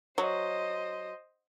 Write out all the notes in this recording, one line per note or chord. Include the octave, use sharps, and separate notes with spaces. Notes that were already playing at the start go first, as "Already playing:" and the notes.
F#3 C5 D#5